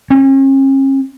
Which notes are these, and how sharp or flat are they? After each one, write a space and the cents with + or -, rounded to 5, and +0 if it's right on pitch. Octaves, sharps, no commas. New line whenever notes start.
C#4 -40